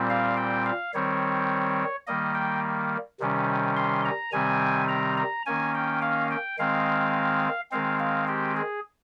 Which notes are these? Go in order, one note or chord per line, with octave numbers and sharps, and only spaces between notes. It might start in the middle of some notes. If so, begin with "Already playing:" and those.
Already playing: A#2 G3 C4
F5
G5
F5
D#3 G3 C4 C#5
D#3 G3 A#3 D#5
G5
C3 D#3 G3 C#4
C6
A#5
C3 D#3 G3 C4 G#5
A#5
A#5
D#3 A#3 C#4 G#5
G5
F5
G5
D#3 G#3 C4 F5
D#3 G#3 C4 F5
F5
G4
G#4